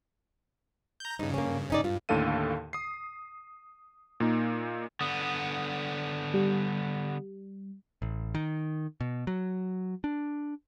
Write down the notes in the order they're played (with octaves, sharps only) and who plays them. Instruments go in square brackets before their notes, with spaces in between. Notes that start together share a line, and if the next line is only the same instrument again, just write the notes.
[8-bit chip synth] A#5 G6
[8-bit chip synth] G2 C#3 [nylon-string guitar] D#4
[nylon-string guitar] A#3 C#4
C#4 D#4 D5
[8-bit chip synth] G2 [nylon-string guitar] F4
[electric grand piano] D#2 A2 D3 A4 F5 D#7
D#6 C7
A#2 A#3 D#4
[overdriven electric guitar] D3 B3 [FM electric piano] D#6
[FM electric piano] G3
[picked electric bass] A1
D#3
B2
F#3
D4